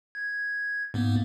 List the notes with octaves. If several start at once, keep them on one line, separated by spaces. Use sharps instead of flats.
G#6
G#2 A#3 B3